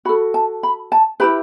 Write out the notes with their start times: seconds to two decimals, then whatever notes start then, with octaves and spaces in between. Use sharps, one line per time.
0.05 F#4 B5
0.09 A4
0.34 A5
0.63 B5
0.92 A5
1.20 E4 G4 B4 B5